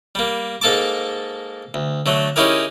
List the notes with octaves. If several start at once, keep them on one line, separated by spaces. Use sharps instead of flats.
G3 A#3
G#2 A#3 A4 A5 D6
D2
D3 F#3 A3
C#4 D#4 E4 G4 G#4 A#4